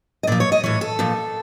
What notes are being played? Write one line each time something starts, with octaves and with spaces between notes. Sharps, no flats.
D#5
A#2 F3 D5
C#5
D#5
A2 E3 C#5
A4
A#2 F3